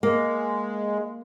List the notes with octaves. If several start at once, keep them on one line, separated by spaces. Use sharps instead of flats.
G#3 A#3